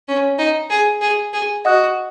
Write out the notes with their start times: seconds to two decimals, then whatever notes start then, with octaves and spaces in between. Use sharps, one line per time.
0.08 C#4
0.38 D#4
0.70 G#4
1.01 G#4
1.33 G#4
1.65 F#4 D#5 F#5 D#6 F#6